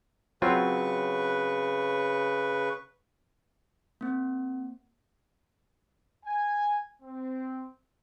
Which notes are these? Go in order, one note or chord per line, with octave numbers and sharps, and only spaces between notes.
C#3 F#3 C4 F4 B4 C#6
A#3 C4
G#5
C4